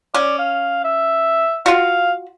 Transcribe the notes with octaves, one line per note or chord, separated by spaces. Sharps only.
C#4 D5
F5
E5
F4 F#4 F5